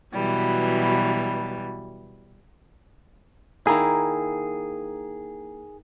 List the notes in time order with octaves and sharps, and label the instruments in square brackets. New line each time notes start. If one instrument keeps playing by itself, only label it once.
[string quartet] B2 E3 F#3 G3
[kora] D#3 A#3 E4 [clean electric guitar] G#4